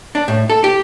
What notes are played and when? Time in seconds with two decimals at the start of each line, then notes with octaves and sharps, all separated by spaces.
0.15 D4
0.28 A2
0.50 A4
0.64 G4